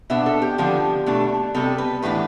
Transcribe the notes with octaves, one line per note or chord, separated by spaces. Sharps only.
B2 B3 D4 E5
A4
G4
D3 F3 B3 D4
B2 A3 D4
C3 G3 B3 A4
B4
A2 E3 B3 D4 B4